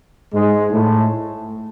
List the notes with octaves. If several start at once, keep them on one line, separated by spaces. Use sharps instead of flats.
G#2 G#3
A2 A3